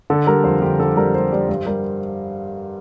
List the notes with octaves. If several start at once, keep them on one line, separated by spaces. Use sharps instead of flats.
D3 A4
G3 A#4
F2 C5
D3 G4
D3 A4
G3 A#4
G3 C5
G3 D5
G2 C5
G3 A#4